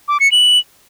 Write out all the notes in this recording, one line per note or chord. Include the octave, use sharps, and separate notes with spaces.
D6
C#7
F#7